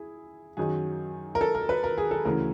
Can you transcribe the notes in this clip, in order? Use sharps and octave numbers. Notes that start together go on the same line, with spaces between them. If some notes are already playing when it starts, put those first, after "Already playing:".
Already playing: E4 G#4
F#2 D#3 F#3 G#4
A#4
A4
A#4
B4
A#4
G#4
A4
D2 C#3 E3 A#4